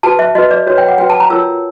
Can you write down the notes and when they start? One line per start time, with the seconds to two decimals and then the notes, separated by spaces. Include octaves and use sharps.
0.03 F#4 B4 A5
0.19 E5
0.35 F#4 B4 D#5
0.51 D5
0.67 F#4 C#5
0.71 B4
0.78 G5
0.88 F#5
0.98 F#4 B4 G5
1.10 A5
1.20 A#5
1.30 F4 A#4 C#5 E6